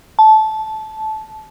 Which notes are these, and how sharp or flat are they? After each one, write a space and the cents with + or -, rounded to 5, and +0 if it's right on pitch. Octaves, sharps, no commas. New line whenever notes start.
A5 -15